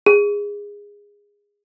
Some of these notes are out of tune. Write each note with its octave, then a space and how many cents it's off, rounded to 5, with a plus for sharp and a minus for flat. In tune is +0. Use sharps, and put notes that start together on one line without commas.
G#4 -20